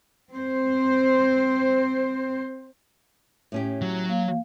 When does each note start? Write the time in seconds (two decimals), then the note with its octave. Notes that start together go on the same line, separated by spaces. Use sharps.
0.31 C4 C5
3.52 A2 C#4 G4
3.82 F#3
4.09 A#3 F5